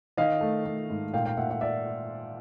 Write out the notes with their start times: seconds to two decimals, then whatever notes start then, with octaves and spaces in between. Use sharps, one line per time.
0.17 D#3 D#5 F5
0.41 A3
0.65 A3
0.90 G#2
1.14 A#2 F5 G5
1.26 F5 G5
1.37 A#2 E5 F#5
1.50 E5 F#5
1.61 D5 E5